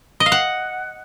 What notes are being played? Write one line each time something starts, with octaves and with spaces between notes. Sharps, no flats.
D#5
F5
F#5